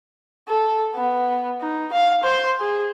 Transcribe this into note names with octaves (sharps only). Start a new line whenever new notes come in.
A4
B3
D#4
F5
C5 C6
G#4